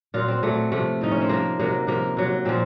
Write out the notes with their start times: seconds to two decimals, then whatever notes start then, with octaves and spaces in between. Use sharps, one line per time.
0.14 A#2 F#3 F4
0.28 C4
0.43 A#2 F#3 A3
0.72 C3 F3 A3
1.01 A2 F3 D#4
1.11 C#4
1.21 C4
1.29 C3 F3 A#3
1.59 C3 F#3 A#3
1.87 C3 F3 A#3
2.17 C3 F#3
2.45 A#2 F3 C4